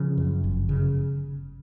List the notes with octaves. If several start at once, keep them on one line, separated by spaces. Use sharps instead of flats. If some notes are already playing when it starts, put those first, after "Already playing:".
Already playing: C#3 F3
F#2
G1
C#3